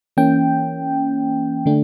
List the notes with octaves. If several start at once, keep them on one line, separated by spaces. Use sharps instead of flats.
E3 A#3 C#4 G5
D3 A3 D4